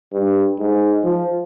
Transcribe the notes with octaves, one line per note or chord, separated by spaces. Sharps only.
G2
G#2
F3